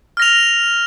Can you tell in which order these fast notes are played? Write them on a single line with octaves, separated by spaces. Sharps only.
F6 A#6 F7